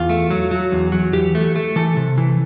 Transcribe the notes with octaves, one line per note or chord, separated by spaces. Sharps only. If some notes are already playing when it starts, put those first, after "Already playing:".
Already playing: E2 F4
A3
F#3
F#3
E2
F#3
E3 G4
A3
A3
E3 A4
C3
E3